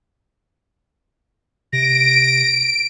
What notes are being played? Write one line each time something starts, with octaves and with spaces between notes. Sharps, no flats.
C3 A#6 D7